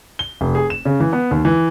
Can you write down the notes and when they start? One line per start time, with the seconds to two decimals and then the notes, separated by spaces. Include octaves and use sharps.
0.19 G7
0.41 F1
0.55 G#4
0.70 E7
0.85 C#3
1.00 E3
1.13 B3
1.31 D#2
1.45 E3